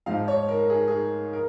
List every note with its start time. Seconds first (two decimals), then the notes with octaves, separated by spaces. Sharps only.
0.06 G#2 F3 F5
0.28 C#5
0.49 A#4
0.70 G#4
0.88 G#4
1.33 A#4